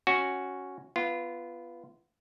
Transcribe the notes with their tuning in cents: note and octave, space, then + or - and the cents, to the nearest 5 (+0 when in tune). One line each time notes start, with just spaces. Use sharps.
C#4 +0 F#4 +0
B3 +0 F4 -20